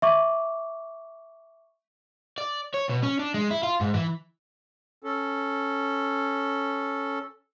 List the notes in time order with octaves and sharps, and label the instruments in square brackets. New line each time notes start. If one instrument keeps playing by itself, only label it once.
[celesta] E5 C#6 D6
[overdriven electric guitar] D5
C#5
B2
C#4
D4
G#3
E4
F4
G#2
E3
[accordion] C#4 A4